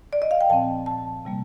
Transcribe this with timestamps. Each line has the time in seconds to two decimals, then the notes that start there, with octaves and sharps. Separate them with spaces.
0.13 D5
0.22 D#5
0.31 F5
0.41 G5
0.49 A#2 F3 C4 A5
0.86 A5
1.25 C3 G3 A#3